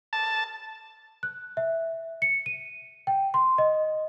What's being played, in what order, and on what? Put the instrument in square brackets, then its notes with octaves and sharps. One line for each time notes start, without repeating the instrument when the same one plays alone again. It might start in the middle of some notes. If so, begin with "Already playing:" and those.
[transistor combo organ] A5
[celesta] F#6
E5
C#7
D#7
G5
C6
D#5